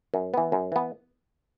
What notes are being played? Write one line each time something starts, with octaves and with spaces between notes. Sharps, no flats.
F#2
E3 B3
F#2
E3 B3